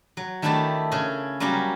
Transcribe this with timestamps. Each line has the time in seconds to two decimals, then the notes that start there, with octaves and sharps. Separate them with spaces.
0.17 F#3
0.42 D#3 A3 D4 E4 G4 A5
0.92 C#3 C#4 G#4
1.40 F#3 G3 A#3 C#4 F#4 G4